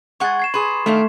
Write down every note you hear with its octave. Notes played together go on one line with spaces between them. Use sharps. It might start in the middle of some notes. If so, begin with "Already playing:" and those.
G#3 G#4 F#5 C#6 A6
G#6 C7 E7
G#4 B4 C6
D#3 A3 D4 F5